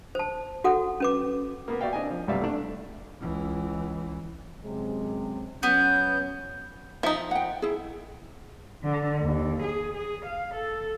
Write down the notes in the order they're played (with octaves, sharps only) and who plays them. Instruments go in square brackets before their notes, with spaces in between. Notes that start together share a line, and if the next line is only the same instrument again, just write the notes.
[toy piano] C5 A5
F#4 A4 F#5
C#4 B4 D6
[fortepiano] A#3 B3 B4
F#4 D5 E5 F5 G5
C4 D4 D#5 G#5
F3
B1 G2 C3 D5 E5 F5
A3 D4
[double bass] C#2 E3
[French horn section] F#2 C3 G#3
[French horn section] F#3 C#4 [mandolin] B3 [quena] G6
[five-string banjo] F3 D#4 [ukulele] E5
[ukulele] F#5 G5
E4 G#4
[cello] D3
D#2
G#4
G#4
F5
A4